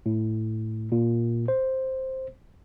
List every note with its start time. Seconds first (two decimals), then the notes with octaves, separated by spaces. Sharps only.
0.06 A2
0.92 A#2
1.48 C5